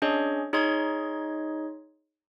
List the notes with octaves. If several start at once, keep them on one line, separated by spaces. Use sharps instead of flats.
C#4 D4 G#4 C#5 D#5
D#4 G#4 C#5 D#5 C6 G#6